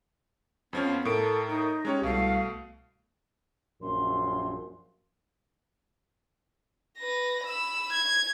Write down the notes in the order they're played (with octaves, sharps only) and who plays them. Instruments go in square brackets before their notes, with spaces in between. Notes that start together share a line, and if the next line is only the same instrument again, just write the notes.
[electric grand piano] F2 F3 C#4 [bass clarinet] B3 [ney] F4
[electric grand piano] A2 D7 [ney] A4 [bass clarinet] A#4
[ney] D#4
[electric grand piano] G#3 C#4 C#5 [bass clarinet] G4
[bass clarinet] C2 [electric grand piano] B2 A3 [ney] F5
[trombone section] A#1 F#2 [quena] C6
[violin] B4 A#6
B5 E6
G#6